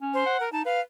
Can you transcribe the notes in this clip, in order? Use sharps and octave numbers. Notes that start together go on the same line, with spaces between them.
C#4
C5
F#5
A#4
D#4 A5
B4 F5